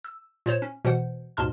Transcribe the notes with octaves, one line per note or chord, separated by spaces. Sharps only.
E6
A#2 C5 C#5 E7
C#4
B2 E3 C5 F#5
D#2 G#2 B2 A5 C6 F6